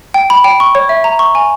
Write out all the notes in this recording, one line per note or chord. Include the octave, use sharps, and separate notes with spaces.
G5
B5
G5
C#6
C#5
E5
A#5
C#6
G#5